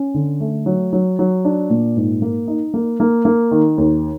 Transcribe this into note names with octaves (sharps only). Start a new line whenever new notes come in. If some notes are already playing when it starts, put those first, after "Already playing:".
Already playing: C#4
D3
A3
F#3
F#3
F#3
D4
A#2
G#2
A#3
D#4
A#3
A#3
A#3
D#3
D#2